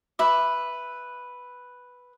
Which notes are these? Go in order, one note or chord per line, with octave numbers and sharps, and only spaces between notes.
B4 E5 D6